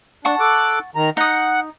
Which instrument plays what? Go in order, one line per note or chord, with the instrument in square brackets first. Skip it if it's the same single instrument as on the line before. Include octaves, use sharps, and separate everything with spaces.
[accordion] D4 [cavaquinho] F#5 A5 C#6
[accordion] A4 D6 F#6
D#3 A#5
[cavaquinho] D#4 D#6 [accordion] F#5